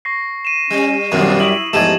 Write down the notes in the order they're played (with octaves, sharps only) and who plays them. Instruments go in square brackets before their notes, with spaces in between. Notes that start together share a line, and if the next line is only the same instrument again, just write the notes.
[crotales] C#6 A#6 C7
D#7 E7
[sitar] G3 [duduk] C#4
[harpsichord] F#2 [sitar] A#2 D#3 F3 [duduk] G3
[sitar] E4 [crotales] C#6 D#6 F#7
[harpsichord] E2 G#2 A3 [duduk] F3 [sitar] G4 [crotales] G#6 D#7 E7